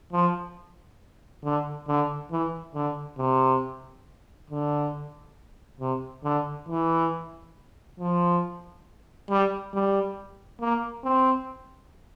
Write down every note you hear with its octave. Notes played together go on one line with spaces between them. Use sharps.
F3
D3
D3
E3
D3
C3
D3
C3
D3
E3
F3
G3
G3
A#3
C4